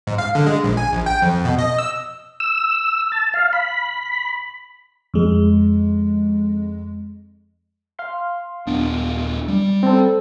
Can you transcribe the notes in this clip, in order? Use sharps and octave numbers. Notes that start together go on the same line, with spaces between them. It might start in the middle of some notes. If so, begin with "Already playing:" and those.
G#2
F5
D3
G#3
A#1
G#5
A#1
G5
F2
B2
D#5
E6
E6
A5
F5
B5
F2 G#3
F5 C6
D#1 B3 D4
G3
C4 A4